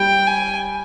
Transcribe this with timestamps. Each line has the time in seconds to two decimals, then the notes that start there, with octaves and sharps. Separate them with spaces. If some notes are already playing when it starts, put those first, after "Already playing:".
Already playing: G3 G5
0.27 G#5